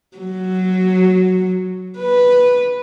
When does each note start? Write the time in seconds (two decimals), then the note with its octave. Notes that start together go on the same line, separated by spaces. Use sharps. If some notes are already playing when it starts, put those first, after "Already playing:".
0.17 F#3
1.98 B4